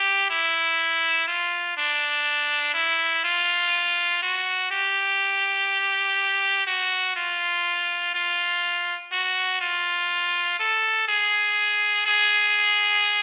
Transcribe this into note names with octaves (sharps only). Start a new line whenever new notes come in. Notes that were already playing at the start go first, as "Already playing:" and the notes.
Already playing: G4
E4
F4
D4
E4
F4
F#4
G4
F#4
F4
F4
F#4
F4
A4
G#4
G#4